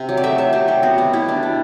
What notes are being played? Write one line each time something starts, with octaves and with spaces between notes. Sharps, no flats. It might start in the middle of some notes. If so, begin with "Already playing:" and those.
Already playing: C3
F#3
D5
A3 E5
F#3 E5
F#3 G4
C3 G4
B3 F#4
B2 F#4
B2 E4
G3 D4
B2